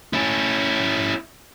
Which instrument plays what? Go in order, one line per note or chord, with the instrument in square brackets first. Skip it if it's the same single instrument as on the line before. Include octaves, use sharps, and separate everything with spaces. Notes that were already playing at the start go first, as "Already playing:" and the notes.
[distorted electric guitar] C#4 E4